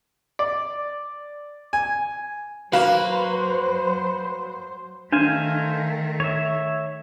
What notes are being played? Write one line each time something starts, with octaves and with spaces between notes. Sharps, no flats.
D5
G#5
F#3 A#3 F#4 B4 C5 F5
D#3 A3 D4 C5 F5 G#5
C#5 E5